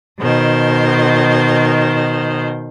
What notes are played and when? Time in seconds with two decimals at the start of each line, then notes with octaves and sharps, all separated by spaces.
0.19 B2 D#3 C5